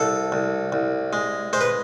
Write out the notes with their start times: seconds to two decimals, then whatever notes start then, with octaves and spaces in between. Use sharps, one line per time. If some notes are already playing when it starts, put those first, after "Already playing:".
Already playing: C2 A4
0.32 C2
0.72 C2
1.13 G#3
1.53 G#3 C5
1.61 B4